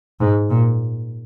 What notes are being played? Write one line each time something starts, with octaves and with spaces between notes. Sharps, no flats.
G#2
A#2